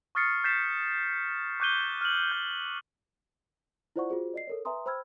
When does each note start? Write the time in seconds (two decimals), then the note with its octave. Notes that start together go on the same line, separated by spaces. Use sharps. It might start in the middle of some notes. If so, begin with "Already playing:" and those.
0.15 C#6 D#6 F6 A6 C7 C#7
0.44 G6 A6 B6 C7 E7
1.60 C#6 D6 F#6 G6 D#7 G7
2.01 F6 F#7
2.32 G6
3.96 E4 F4 C5 D5 F#5 C#6
4.10 F4 F#4 G#4 C5
4.34 D5 D#5 C7
4.47 A4 A#4 C#5
4.65 B4 E5 G#5 A#5 C6 D#6
4.86 C5 G5 B5 E6 F6 G#6